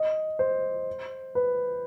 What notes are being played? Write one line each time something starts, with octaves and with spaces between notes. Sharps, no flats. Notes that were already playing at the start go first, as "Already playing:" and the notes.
Already playing: D#5
C5
B4